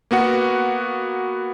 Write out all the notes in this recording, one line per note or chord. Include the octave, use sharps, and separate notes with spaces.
A#3 B3 F#4 F#5